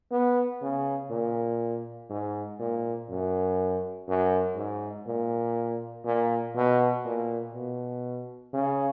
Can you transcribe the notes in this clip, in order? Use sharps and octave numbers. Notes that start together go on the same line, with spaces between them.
B3
C#3
A#2
G#2
A#2
F#2
F#2
G#2
A#2
A#2
B2
A#2
B2
C#3